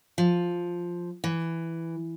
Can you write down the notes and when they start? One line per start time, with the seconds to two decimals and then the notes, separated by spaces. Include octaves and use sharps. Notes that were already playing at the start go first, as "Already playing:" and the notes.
0.18 F3
1.24 E3